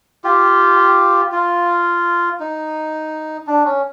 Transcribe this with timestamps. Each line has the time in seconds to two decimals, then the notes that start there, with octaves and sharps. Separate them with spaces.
0.24 F4 G4
1.32 F4
2.40 D#4
3.47 D4
3.65 C#4